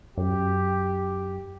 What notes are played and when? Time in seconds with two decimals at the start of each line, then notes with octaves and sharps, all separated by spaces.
0.18 F#2 G4